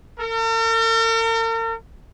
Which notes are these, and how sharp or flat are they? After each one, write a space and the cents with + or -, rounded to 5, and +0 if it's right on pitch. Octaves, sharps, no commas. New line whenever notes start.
A#4 -45